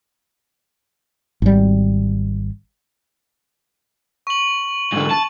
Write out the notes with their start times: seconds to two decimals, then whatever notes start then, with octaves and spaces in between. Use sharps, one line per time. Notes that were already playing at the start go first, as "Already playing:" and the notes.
1.42 G#1 G3
4.27 C#6 F#7
4.93 G#2 D3
5.11 A5